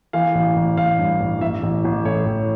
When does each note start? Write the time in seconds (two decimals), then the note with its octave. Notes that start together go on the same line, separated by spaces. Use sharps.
0.13 E3 F5
0.35 A1
0.56 A1
0.77 A1 F5
0.99 G2
1.20 A1
1.41 A1 E5
1.63 A1
1.84 A1
2.05 A2 C#5
2.27 A1